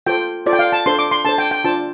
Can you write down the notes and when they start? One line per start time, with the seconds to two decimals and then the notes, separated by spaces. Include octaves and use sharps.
0.06 F4 A4 C5 G5
0.46 F4 A4 C5 D5
0.53 G5
0.59 F5
0.72 A5
0.86 D4 A4 C5 C6
0.99 D6
1.11 C6
1.25 D4 A4 C5 A5
1.38 G5
1.51 G5
1.64 D4 F4 C5 A5